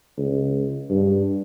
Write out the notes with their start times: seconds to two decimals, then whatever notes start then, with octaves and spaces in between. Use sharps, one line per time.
0.18 C#2
0.90 G2